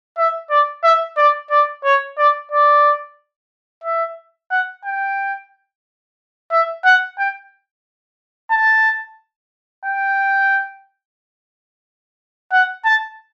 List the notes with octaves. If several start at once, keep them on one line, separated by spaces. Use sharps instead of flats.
E5
D5
E5
D5
D5
C#5
D5
D5
E5
F#5
G5
E5
F#5
G5
A5
G5
F#5
A5